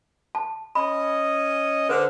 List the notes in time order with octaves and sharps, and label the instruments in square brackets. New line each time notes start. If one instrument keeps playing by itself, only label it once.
[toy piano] A5
[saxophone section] C#4 D#5 [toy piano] B5
[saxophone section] D3 [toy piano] B4 C5